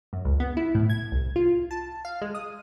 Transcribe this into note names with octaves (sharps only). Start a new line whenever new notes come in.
F#2
C#2
B3
E4
A2
G#6
C2
F4
A5
F5
G#3
D#6